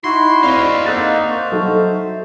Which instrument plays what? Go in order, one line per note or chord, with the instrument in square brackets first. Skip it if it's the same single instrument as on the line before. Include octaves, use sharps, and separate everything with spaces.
[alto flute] D#4 [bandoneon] E4 F#4 [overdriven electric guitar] C6
[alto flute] C4 [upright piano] D5 G7 [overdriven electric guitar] D#5 F5
[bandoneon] A#3 D#4 [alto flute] F#5 [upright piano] E6 F#6 A6
[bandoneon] C5 [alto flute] C#6
[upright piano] F#3 D#4 A4
[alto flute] E5